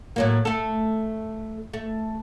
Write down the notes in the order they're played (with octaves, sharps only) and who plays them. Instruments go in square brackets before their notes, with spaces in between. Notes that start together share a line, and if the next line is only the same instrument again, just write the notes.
[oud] A2 F#3 A#3
A3 A4
A3